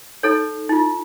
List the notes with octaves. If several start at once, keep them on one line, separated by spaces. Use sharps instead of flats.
D#4 A4 C#5
D#4 F4